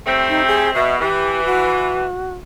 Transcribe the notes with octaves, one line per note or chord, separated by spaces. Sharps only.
G3 A3 C4
D#4
G#4
B2 E5
E3 G4
F#4